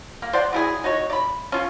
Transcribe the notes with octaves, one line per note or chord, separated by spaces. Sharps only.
A#3
C5 D5 F#5
F#3 E4 G#4
D#4 F#4 C#5
D5 B5
C#4 F4